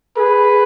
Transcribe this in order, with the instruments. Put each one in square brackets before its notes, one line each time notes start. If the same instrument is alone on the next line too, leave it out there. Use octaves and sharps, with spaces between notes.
[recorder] G#4 A4 [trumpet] B4